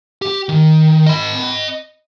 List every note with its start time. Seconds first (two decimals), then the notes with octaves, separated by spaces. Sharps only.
0.22 G4
0.49 D#3
1.06 D#5 B5